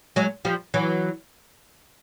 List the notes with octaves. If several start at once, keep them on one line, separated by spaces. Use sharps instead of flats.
F#3 G#3
F3 G3
E3 F#3